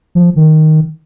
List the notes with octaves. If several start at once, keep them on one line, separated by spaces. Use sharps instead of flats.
F3
D#3